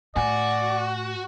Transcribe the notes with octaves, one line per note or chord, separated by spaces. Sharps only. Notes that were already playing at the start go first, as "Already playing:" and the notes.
A2 F#4 D5 G#5